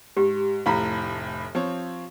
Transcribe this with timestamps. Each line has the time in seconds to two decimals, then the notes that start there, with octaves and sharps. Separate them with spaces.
0.17 G#2 G4
0.66 F1 A2 F5 A#5 B5
1.55 F3 C4 C#5